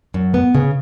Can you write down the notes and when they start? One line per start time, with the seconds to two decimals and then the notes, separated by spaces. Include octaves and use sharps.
0.14 F#2
0.34 B3
0.55 C#3